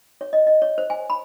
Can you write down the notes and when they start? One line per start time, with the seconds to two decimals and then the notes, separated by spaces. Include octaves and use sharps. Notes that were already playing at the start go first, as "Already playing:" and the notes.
0.21 C#5
0.33 D#5
0.47 D#5
0.62 C#5
0.78 C5
0.90 G#5
1.10 B5